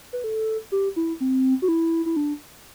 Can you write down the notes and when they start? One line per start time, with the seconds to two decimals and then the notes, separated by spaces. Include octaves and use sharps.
0.13 B4
0.24 A4
0.72 G4
0.96 E4
1.20 C4
1.62 F#4
1.68 E4
2.06 E4
2.16 D4